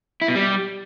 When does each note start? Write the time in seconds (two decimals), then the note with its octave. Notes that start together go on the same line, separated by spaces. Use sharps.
0.22 E4
0.28 B2
0.35 G3